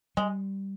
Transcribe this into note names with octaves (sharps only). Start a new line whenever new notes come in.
G3 G#3